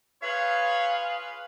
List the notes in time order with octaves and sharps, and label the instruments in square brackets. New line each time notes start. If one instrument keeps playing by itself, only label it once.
[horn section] F4 G#4 B4 [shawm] C#5 [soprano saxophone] F5